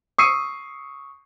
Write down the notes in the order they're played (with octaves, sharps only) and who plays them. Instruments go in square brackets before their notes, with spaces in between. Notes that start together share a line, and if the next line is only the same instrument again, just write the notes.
[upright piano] C#6 D#6 E6 C7 C#7 D#7